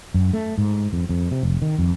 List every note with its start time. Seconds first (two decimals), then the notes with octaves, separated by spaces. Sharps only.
0.14 F#2
0.34 A3
0.58 G#2
0.93 F2
1.09 F2
1.31 C3
1.43 F1
1.62 D#3
1.79 F2